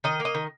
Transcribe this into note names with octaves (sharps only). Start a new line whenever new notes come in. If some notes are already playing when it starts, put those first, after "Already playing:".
D#3 D#5
A#3
D#5
D#3